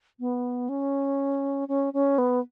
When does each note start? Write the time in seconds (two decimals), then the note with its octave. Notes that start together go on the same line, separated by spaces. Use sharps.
0.20 B3
0.69 C#4
1.68 C#4
1.93 C#4
2.18 B3